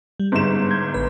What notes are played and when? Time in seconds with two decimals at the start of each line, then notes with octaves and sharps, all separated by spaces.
0.20 G3
0.32 G1 G#2 E7
0.70 G6 G#6
0.94 A1 B4